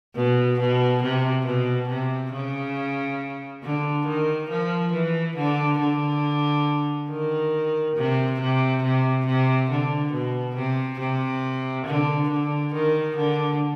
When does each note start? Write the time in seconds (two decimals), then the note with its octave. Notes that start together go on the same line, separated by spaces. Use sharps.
0.15 B2
0.60 B2
1.03 C3
1.46 B2
1.89 C3
2.33 C#3
3.63 D3
4.07 D#3
4.49 F3
4.92 E3
5.36 D3
5.79 D3
7.09 D#3
7.96 C3
8.40 C3
8.83 C3
9.26 C3
9.70 D3
10.12 B2
10.56 C3
11.00 C3
11.86 D3
12.29 D3
12.74 D#3
13.16 D3